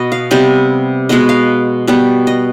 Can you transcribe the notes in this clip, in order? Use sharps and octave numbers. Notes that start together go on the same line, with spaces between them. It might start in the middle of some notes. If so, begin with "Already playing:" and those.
Already playing: B2 B3 D#5
F5
C3 G3 B3 D#5
B2 G#3 B3 D#5
F5
B2 G3 B3
D#5